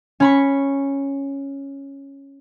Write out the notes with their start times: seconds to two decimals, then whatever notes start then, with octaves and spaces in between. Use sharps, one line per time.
0.20 C#4 B5 C#6